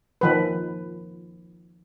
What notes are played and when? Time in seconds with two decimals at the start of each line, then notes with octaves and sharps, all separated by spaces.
0.21 D#3 F3 B4